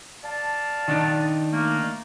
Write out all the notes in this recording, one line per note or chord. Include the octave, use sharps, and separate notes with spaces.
D5 F5 A5
D#3 D4 D#4
A3 A#3